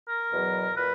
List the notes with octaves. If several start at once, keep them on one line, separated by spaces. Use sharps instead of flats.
A#4
E2 B2 F#3
A#2 B4